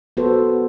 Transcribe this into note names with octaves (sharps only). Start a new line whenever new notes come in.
B3 F#4 A4 C5